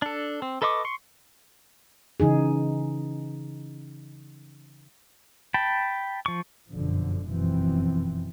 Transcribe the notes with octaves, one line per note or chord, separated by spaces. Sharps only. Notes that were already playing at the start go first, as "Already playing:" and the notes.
D4 A4
C4
A4 B4 D#5 C#6 D6
C6 C#6
C#3 E3 D#4 G#4
G5 A5 B5
F3 C#6
G1 F#2 B2 D3 F3
F1 F#2 B2 E3 F3 C4